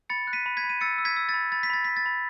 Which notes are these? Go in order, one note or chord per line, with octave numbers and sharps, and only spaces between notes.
B5 A6 C#7
F#6
B6 D#7
B5
G#6 B6
B5
D#7
E6 A6 C#7
E6
G#6 B6
E6
A6
B5
B5 A6
B6
B5 A6
B5 B6
A6
B5